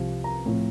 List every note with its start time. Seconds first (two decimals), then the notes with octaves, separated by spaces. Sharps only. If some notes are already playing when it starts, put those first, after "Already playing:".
Already playing: C2 C3 F3
0.24 A#5
0.46 A2 F3 C4